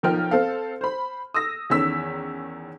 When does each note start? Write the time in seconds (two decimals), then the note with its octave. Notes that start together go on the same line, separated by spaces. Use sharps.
0.03 B1 F3 D#4 A#4 G5 F6
0.31 C4 A4 F5
0.81 C5 B5
1.34 D#6 E6 A#6
1.70 E2 D#3 C#4 E6 B6